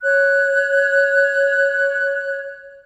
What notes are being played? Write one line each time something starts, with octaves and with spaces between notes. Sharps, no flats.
C#5 F#6